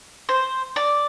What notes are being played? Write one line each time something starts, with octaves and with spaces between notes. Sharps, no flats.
C5
D5